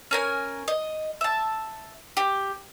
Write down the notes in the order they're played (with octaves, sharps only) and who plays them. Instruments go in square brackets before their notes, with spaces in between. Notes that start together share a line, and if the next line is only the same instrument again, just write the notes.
[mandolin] C#4 A#4 G#5
D#5
E5 A5
G4